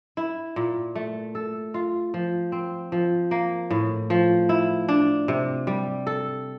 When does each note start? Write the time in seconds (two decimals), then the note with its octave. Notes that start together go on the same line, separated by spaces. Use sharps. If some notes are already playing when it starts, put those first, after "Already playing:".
0.17 E4
0.56 A#2
0.96 A3
1.35 A4
1.74 F4
2.14 F3
2.52 C4
2.92 F3
3.31 A#3
3.71 A2
4.10 F3
4.49 E4
4.89 D4
5.28 C3
5.67 G3
6.07 A4